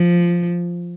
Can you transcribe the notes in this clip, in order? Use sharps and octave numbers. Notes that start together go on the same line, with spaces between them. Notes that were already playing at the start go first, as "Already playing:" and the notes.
Already playing: F3